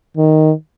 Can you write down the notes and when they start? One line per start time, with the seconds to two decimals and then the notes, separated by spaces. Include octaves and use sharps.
0.17 D#3